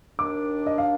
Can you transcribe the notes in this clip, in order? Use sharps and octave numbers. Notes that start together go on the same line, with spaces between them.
D#2 D#3 A#3 D4 D6
D#5
F5